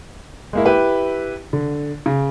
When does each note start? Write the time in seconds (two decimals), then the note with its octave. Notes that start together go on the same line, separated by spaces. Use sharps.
0.53 G#3 A#3 E4
0.66 E4 G4 B4
1.53 D3
2.06 C#3